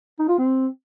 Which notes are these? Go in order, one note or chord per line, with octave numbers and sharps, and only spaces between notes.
D#4
F4
C4